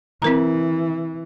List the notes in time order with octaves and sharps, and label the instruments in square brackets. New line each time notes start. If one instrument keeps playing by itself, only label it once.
[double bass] E3 [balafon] C4 A#4 A#5